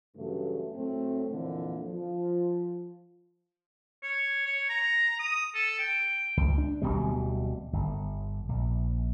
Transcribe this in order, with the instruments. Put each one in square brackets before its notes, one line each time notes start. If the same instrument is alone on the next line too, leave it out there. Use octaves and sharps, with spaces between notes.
[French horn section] G2 C#3 E3 F#3 A3
A2 F#3 A3 C4
F2 A#2 D3 E3
F3
[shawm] C#5
C#5
A#5
D#6
A4
G5
[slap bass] C#2
D4
D1 C2 B2 G3
G1
A#1